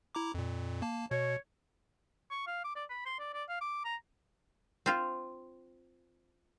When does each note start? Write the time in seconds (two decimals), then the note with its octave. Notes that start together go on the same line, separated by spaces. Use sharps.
0.15 E4 A#5 D6
0.34 F2 A#2
0.82 A#3 A5
1.11 B2 C#5
2.31 C#6
2.47 F5
2.64 D6
2.76 D5
2.90 B5
3.06 C6
3.19 D5
3.33 D5
3.49 F5
3.61 D6
3.85 A#5
4.86 C4 F4